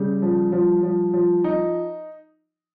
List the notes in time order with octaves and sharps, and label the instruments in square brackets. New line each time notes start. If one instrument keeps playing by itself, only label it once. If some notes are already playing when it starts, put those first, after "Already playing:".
Already playing: [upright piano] C#3 [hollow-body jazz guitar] G3
[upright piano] F3
F3
F3
F3
D#4